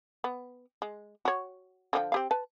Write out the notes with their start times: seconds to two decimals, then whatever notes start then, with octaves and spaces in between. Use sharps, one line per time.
0.24 B3
0.82 G#3
1.25 F#4 C#5
1.93 D3 F3 G5
2.12 C4 G4 F5
2.31 B4 A5